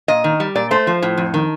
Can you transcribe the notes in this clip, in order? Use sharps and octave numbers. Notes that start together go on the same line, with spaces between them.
A#2 D#5
D#3
G3
A#2 D5
A3 C5
F3
A2
F2
D#3